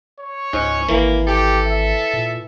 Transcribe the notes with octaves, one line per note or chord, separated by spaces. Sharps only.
C#5
C#2 G#2 C#4
G#1 E3 A#3
G4 A4
E5
A#2